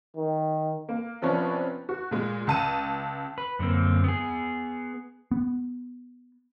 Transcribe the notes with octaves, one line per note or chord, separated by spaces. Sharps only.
D#3
A#3
C3 F3 B3 C#4 D4
F#4
A#2 G#3
C#2 A5 D#7
B4
F#2 D3 A#3 C4
B3 G#4
B3